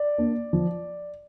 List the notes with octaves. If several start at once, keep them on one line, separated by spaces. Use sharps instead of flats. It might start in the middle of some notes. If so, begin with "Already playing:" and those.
Already playing: D5
A#3 D4
F3